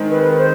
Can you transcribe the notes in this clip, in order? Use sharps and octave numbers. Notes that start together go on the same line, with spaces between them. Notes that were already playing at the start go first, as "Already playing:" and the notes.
Already playing: D#3 G#3 C4
B4
B4
C5